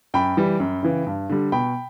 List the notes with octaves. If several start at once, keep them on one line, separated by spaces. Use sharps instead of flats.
F#2 G5 B5
E3 G3
F#2
C#3 E3
G2
D3 G3
B2 G5 B5